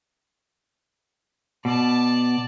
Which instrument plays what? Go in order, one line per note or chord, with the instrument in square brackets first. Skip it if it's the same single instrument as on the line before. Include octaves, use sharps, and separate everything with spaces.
[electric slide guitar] B2 [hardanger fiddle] D5 A5